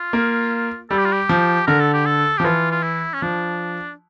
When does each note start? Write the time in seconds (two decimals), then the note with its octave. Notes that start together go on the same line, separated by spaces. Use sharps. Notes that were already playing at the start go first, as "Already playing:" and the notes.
Already playing: F4
0.13 A#3
0.90 G3 A4
0.98 G4
1.05 F4
1.12 G4
1.29 F3
1.67 D3 A#4
1.80 A4
1.94 G4
2.06 A4
2.38 F3 G4
2.44 E3 F4
2.71 F4
2.83 E4
3.14 C#4
3.22 F3 D4